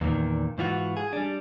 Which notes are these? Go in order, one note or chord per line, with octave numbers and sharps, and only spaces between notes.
E2 A#2 D3 D#3
G#2 E3 F4 F#4
G#4
G3 D4